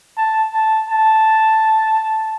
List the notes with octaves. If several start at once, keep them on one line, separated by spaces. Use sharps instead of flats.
A5
A5
A5